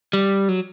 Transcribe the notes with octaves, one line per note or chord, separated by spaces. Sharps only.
G3
F#3